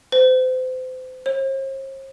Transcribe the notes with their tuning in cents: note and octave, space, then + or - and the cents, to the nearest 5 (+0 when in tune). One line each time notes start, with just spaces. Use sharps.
C5 -35
C5 +45